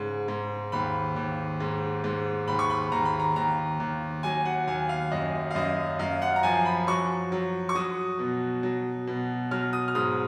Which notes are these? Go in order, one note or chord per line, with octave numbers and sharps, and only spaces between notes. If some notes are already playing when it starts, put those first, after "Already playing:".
Already playing: G#2 C#3
G#2
D#2 B5
D#2
G#2
G#2
D#2 B5
C#6
B5
D#2 A#5
B5
A#5
D#2 A#5
D#2
F#3 G#5
F#5
D#2 G#5
F5
F#2 D#5
F5
F#2 D#5
F#2 F5
F#5
A#5
F3 G#5
B5
F#3 C#6
F#3
C#6
F#3 D#6
B2
F#3
B2
F#3 F6
D#6
F6
G#2 D#6